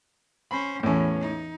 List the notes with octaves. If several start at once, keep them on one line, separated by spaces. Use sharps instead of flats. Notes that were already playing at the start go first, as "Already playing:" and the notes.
C#4 C5 B5
E2 A2 E3 C#4
D#4